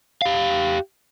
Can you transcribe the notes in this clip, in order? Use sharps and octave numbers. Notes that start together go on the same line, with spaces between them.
G4 F5